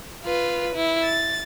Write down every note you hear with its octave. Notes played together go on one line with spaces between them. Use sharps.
F4 B4
E4
A6